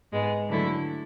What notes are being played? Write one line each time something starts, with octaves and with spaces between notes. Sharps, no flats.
G#2 G#3 B3
D3 F#3 A3 E4 A4